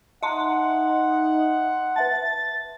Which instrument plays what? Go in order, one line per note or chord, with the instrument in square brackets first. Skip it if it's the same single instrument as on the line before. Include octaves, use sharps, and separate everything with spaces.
[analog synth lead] D#4 [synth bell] E5 C6 [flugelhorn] F#5 [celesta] A5
[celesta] B4 E5 A5 [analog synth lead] A6